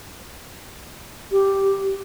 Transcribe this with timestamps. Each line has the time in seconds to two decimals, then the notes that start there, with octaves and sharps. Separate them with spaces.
1.32 G4